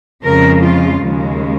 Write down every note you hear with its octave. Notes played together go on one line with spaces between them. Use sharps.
F2 C#3 F3 G#3 A#4
F4
D#2 C#3 G#3